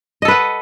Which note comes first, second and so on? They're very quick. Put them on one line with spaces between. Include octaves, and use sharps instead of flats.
D#5 A4 B4 F#5